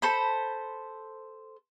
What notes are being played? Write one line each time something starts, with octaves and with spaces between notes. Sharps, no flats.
A4 C5 B5